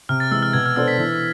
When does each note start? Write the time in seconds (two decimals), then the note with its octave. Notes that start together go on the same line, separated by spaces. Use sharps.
0.09 C3 F6
0.20 A6
0.31 E3 G#3 E6
0.42 F6
0.53 B2 G#6
0.66 F6
0.76 B3 D4 A4 C5 E6
0.88 B6
0.98 E3